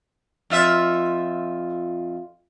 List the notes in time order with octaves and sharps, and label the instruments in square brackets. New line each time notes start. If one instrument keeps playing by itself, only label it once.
[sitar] F2 F4 E5